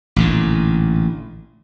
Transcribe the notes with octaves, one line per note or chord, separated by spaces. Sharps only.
A1 A#2 D3